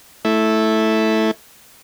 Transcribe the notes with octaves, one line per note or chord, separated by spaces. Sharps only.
A3 E4